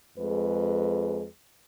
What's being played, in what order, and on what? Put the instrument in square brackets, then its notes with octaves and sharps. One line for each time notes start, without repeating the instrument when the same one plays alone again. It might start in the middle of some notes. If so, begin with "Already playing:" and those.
[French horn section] F2 G#3 G#4 B4